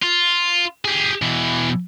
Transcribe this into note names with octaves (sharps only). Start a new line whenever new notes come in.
F4
G4 G#4
B2 E3